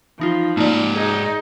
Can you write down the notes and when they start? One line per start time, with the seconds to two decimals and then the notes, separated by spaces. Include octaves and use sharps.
0.20 E3 F3 D#4 F4
0.57 G#2 A3 A#3 D#4 D5
0.96 D#4 G#4